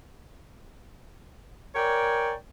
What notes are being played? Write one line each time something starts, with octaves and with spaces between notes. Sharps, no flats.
A#4 C#5 D5 G5 G#5